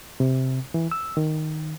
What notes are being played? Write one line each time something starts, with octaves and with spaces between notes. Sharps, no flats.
C3
E3
E6
D#3